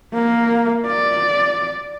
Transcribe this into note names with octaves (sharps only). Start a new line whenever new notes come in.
A#3
D5